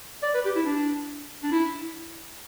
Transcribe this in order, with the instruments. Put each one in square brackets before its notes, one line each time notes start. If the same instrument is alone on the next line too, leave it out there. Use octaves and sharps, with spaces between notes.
[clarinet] D5
B4
G4
E4
D4
D4
E4